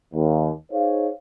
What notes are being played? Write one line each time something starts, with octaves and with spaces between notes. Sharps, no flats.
D#2
D#4 G#4 C5 C#5 F5